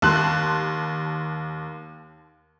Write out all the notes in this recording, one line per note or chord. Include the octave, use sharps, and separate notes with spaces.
D#2 A5 C6 F#6